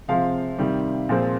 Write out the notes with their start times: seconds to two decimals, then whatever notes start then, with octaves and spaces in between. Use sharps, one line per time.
0.08 C3 F3 G#3 C4 F5
0.58 C3 D#3 G3
1.09 A#2 F3 G#3 C4